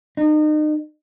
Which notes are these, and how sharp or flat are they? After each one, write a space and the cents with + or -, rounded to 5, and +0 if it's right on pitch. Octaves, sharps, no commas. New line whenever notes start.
D#4 -35